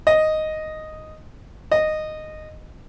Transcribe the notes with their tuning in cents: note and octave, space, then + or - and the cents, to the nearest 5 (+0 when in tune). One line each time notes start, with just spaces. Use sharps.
D#5 +0
D#5 -10